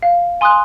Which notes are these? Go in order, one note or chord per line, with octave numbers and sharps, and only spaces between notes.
F5
G#5 C6 D#6 F#6